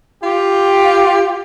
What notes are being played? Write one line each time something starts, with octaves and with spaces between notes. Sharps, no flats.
F4 G4